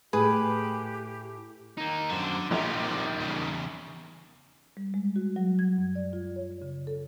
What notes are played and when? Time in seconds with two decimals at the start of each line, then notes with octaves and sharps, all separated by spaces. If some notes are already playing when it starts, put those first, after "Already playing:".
0.13 A2 G4 G#4 B4
1.77 A#3 D#4
2.10 F#2 D3 C5
2.51 A#1 D#3 G3 C#4 F4
2.77 C3 F3
3.20 E2 C#3
4.77 G3
4.94 G#3
5.16 F#4
5.36 F#3
5.59 G#6
5.78 F#2
5.95 D5
6.13 F4
6.36 C#5
6.62 C#3
6.87 A4